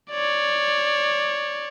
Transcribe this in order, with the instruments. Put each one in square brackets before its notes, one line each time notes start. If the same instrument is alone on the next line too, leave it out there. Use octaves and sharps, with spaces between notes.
[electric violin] C#5 D5